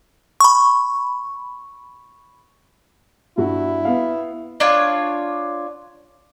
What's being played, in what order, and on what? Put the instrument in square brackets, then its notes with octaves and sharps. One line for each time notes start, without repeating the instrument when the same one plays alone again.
[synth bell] B5 C#6
[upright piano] G2 F#4 [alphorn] E4
[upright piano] B3 F5
[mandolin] D4 F4 C#5